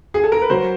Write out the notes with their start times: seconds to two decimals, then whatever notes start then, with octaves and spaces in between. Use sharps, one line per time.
0.14 G#4
0.24 A4
0.32 A#4
0.42 B4
0.50 F#3 A#4 C5